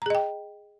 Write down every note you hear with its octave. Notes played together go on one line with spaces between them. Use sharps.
G#4 D#5 G5 A#5